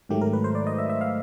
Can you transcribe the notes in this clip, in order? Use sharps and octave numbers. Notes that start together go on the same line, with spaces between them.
G#2 D#3 F#3 A3 G4
A#4
B4
C5
D5
D#5
E5
E5
F5